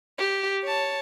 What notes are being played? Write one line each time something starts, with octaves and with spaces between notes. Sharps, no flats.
G4
C#5 A5